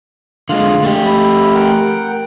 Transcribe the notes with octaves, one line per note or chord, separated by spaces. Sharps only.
D3 G#3 F4 F5
A3 G4
E5 B5
A#4 F#5 G5